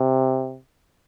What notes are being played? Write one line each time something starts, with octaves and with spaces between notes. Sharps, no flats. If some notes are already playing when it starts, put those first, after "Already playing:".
Already playing: C3